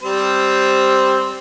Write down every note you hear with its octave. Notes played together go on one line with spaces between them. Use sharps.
G3 C4 C5